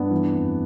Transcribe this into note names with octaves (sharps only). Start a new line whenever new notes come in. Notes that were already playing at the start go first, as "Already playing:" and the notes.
Already playing: G2 B3 D4
E3
F2